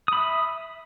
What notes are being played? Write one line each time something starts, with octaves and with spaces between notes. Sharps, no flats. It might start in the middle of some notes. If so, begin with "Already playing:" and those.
E5 B5 D#6